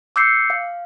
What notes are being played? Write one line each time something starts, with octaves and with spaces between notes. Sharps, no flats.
D6 E6 G6 C7 C#7
F5